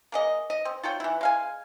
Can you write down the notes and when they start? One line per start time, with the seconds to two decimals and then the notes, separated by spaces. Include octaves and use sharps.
0.12 A#3 G#4 D#5
0.50 D#5
0.65 C4
0.83 F4 F#4 C#5 G5
1.00 E3 E4
1.21 G#3 F5 G#5